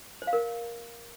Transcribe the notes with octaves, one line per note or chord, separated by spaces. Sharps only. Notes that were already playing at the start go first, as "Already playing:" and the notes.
C5
F5
A#4